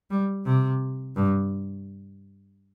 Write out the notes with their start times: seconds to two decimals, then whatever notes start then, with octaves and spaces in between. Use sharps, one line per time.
0.10 G3
0.45 C3
1.16 G2